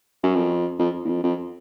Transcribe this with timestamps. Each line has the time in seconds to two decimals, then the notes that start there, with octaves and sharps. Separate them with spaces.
0.23 F#2
0.35 F2
0.79 F2
1.05 E2
1.09 F2
1.23 F2